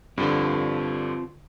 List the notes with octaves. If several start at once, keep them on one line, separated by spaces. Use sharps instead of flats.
G2 D3 C4 F4 C5